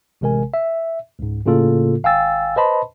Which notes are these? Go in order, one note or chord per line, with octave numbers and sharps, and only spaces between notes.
A1 C3 G#3 A#4 G#5
E5
C#2 G#2
A2 C#3 A#3 F4 A4
G#1 F5 G5 G#5 E6 A6
B4 C5 D#5 A5 B5 C6